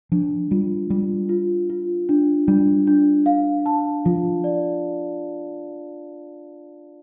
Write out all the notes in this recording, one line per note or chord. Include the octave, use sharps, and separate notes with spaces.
F3 D4
G3 F4
G3 F4
F4
F4
D4
G3 D4
D4
F5
A5
F3 F4
D5